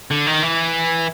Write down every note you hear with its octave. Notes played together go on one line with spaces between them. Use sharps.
D3
D#3
E3